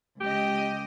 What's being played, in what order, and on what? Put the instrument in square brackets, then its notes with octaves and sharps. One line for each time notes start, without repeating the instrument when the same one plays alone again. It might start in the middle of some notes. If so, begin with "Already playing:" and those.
[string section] C#2 D#5 [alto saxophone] G4